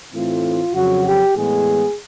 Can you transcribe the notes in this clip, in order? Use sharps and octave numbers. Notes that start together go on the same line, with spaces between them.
A2 E3 A3 C4 F4
F2 C#3 F#3 F#4
G4
A2 E3 G#3 B3 G#4